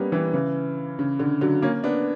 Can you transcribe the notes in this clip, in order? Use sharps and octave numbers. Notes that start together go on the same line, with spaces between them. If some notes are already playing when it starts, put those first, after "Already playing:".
Already playing: G3 A#3 B3 C#4
E3 G3
C#3 E3
C#3
D3
D3 F#3
A#3 C#4
B3 D4